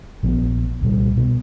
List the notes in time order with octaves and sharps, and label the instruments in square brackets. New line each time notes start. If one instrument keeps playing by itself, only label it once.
[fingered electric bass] A#1 F3 B3
C2 A#2 G3
B2